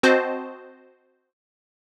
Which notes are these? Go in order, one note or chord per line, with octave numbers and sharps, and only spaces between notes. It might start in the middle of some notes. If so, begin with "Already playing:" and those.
C4 F#4 C5 D#5 A5